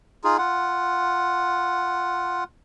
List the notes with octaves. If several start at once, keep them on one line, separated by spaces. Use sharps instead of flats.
D#4 F4 G#4
F4 F#5